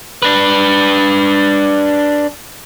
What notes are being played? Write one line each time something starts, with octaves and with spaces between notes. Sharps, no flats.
D4 B4